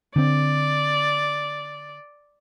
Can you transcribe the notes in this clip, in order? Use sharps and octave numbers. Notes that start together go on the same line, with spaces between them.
D3 C4 D5